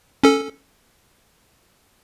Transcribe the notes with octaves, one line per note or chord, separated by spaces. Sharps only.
C#4 A4